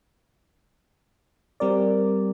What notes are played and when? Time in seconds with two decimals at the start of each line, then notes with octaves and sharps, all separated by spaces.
1.60 G3 C4 A#4 D5